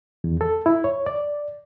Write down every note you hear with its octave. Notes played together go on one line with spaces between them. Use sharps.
E2
A4
E4
C#5
D5